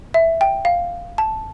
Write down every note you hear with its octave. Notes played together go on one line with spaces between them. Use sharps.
E5
G5
F5
A5